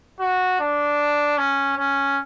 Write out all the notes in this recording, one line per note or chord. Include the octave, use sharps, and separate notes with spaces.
F#4
D4
C#4
C#4